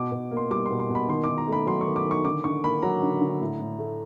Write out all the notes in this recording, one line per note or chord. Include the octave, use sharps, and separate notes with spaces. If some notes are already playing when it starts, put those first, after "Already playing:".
Already playing: B2 D6
B2
A#3
C6
G3 D6
C6
B2
C6
B2
B5
D#3 C6
D#3 D6
A#5
A3 B5
F#3 C6
C#6
D#3
D6
D#3
C#6
D3 D6
D3 C#6
A#3 B5
F#3 A#5
D3
D3
A2
A2
A3